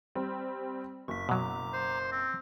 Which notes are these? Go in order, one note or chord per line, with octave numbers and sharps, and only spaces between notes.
G3 C4
F#1 C#6 B6
B2 F#3 A#5 D6
C5
C4